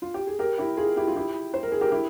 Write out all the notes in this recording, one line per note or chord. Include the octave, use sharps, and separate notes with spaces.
F4
G4
G#4
G4 A#4
E4 G4
F4 G#4
E4 G4
F4
E4 G4
C5
A#4
G#4
G4 A#4
E4 G4